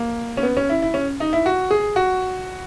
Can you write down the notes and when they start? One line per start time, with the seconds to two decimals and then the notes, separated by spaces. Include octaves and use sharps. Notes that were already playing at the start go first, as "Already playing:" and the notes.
Already playing: A#3
0.37 C#4
0.43 B3
0.57 C#4
0.69 E4
0.82 E4
0.94 C#4
1.20 D#4
1.33 E4
1.46 F#4
1.71 G#4
1.96 F#4